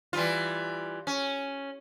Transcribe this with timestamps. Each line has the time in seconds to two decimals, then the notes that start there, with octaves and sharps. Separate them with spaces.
0.13 E3 G3 F4
1.07 C#4